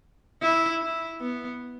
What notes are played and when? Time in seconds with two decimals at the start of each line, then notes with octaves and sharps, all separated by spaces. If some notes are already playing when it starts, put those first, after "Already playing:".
0.42 E4
0.82 E4
1.21 B3